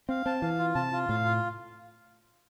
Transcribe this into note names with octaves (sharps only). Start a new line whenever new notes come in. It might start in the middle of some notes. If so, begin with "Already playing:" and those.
C4 F5
C4 A5
E3 F5
F4
C3 A5
F4
A2 F5
F4